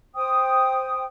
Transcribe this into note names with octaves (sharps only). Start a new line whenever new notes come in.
C5 G5 D#6